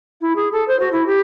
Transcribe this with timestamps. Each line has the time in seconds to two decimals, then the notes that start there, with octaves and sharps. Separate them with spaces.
0.21 E4
0.35 G#4
0.52 A4
0.67 C5
0.79 F#4
0.92 E4
1.06 G4